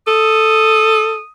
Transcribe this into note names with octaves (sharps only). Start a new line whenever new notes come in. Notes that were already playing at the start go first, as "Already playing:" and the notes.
A4 D#6